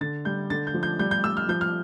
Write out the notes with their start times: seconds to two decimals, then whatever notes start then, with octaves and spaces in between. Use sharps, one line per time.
0.01 D3 A6
0.25 G3 G6
0.50 D3 A6
0.67 G6
0.74 F3
0.83 G6
0.99 G3 G6
1.11 G6
1.24 G3 E6
1.37 F6
1.49 F3 G6
1.61 F6